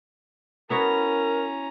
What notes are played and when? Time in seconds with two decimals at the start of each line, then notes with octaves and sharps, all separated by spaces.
0.70 B3 C#4 E4 F#4 A#4 A#5